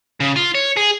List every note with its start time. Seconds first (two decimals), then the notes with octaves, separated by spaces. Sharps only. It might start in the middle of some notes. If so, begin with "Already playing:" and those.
0.20 C#3
0.36 F4
0.55 C#5
0.77 G#4